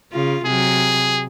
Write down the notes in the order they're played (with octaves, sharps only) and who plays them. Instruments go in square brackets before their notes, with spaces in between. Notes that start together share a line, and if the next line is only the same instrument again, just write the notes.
[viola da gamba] C#3 F4
[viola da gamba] C3 F#3 [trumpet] G#4